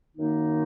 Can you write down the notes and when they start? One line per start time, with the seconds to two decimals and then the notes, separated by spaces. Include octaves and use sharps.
0.15 F#2 D#3 A#3 D#4